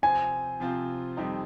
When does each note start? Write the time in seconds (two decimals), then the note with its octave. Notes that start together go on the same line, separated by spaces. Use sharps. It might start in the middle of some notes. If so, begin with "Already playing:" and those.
0.02 C3 F3 C4 F4 C5 G#5
0.60 C3 F3 C4 F4 C5
1.17 F2 D#3 G3 C4 D#4